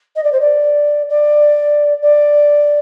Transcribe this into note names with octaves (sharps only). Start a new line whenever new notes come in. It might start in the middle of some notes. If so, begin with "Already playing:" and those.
D#5
D5
C5
D5
D5
D5